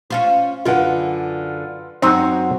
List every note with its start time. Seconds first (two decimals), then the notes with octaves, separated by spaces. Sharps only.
0.10 C#4 F4 C5
0.65 F#2 D3 F4 B4 F#5
2.02 F#2 F#3 C4 D#4 F#4